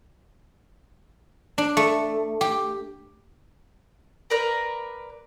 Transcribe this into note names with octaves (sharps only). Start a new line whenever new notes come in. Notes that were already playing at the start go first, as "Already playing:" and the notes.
D4
A3
G4
A#4 B4 D5 A#5